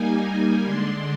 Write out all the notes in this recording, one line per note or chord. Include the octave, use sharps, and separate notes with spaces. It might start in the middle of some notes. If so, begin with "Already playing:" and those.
Already playing: G3 A#3 D#4 G#5
G#5
D3 G#3 D4 C6